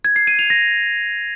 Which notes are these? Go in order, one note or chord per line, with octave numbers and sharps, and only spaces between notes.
G#6
C7
D#7
F7
A#6